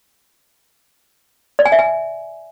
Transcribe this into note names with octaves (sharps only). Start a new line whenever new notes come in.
D5
G#5
E5
G#5